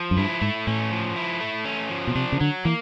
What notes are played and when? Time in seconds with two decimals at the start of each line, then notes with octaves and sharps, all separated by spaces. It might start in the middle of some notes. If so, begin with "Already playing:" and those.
Already playing: F3
0.11 F#2
0.17 G2 E4
0.41 G#2 A3
0.67 A2 C#4
0.91 F3
1.16 E4
1.41 A3
1.65 C#4
1.90 F3
2.07 B2
2.16 C3 D4
2.32 C#3
2.40 D3 F#3
2.65 E3 A#3